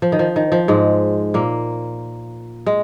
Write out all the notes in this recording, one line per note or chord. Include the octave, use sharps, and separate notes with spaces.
F3
D#3
F3
D#3
F3
G#2 G#3
A#2 A#3
G#3